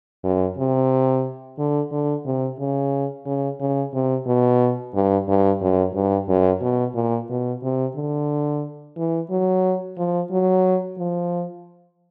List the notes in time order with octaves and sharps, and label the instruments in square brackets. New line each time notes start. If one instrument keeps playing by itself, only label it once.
[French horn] F#2
C3
D3
D3
C3
C#3
C#3
C#3
C3
B2
G2
G2
F#2
G2
F#2
B2
A#2
B2
C3
D3
E3
F#3
F3
F#3
F3